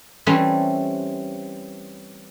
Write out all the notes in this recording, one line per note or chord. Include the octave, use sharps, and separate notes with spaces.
E3 G3 A3 C4 C#4